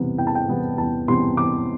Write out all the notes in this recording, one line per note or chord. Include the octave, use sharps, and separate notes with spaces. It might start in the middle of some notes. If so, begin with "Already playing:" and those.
Already playing: E2 C3 E3 G3 B3
E2 G5
A5
G5
C3 E3 G3 B3
E2 A5
C3 E3 G3 B3 C6
E2 D6